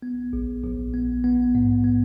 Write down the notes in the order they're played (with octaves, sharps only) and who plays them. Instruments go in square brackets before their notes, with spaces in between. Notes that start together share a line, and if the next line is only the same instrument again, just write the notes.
[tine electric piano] B3
A#1
A#1
B3
B3
G#2
B3